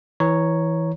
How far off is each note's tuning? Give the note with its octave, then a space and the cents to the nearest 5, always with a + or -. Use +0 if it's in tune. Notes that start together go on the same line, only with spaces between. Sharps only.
E3 -15 C#5 +0 A#5 +0